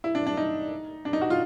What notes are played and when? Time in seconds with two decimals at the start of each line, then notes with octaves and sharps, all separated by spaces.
0.04 E4
0.15 D4
0.27 D4
0.37 D#4
1.05 D4
1.13 D#4
1.21 F#4
1.30 F4